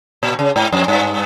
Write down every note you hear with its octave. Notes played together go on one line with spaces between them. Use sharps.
A#2
C#3
G#2
F2
G2